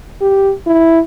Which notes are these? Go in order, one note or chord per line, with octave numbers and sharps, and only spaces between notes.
G4
E4